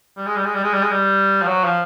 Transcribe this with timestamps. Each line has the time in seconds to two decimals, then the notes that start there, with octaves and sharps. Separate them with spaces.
0.17 G3
0.26 G#3
0.36 G3
0.45 G#3
0.54 G3
0.64 G#3
0.73 G3
0.82 G#3
0.91 G3
1.41 F3
1.47 F#3
1.64 F3